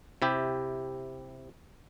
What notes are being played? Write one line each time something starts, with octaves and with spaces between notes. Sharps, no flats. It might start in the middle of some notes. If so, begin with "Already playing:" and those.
C3 E4 G4